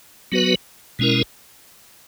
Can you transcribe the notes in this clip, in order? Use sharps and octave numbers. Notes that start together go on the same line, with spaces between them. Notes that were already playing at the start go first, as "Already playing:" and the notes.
F#3 B3 F#4 B4
B2 G#3 C#4 E4 A#4